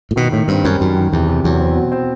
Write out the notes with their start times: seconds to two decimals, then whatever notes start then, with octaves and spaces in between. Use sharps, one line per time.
0.11 A2
0.16 B2 D#3
0.32 A2 D#3
0.48 G2 C4
0.64 F#2 G3
0.80 F#2 D#3
0.97 D#3
1.13 E2 C3
1.29 C3
1.44 E2 F#3
1.60 C4
1.76 B2
1.92 C4